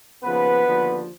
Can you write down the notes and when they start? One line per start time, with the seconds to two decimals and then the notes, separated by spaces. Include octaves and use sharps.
0.23 D#2 C#3 F3 B3 B4
0.65 D#2 D3 F3